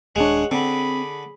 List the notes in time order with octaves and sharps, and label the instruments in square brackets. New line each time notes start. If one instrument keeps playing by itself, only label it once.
[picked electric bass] D#1 D4 [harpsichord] G#3 [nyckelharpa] C#5 F#5
[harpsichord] D3 [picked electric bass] C4 [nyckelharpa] G#4 B5